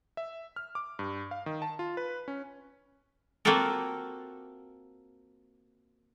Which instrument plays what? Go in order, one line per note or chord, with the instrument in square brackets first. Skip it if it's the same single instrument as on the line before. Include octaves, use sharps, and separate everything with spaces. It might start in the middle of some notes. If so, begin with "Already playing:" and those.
[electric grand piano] E5
F6
D6
G2
F5
D#3
A5
F4
B4
C#4
[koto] A#3 C4 F4 F#4 A4 A#4